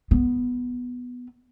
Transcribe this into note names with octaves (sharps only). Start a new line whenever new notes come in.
B3